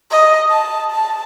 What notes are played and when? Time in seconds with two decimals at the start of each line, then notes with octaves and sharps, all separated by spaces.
0.10 D#5
0.50 A5
0.91 A5